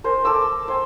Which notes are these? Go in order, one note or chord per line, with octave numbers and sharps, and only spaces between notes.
A#4 C5 G#5
A4 A#5 D6 E6
C5 G5 G#5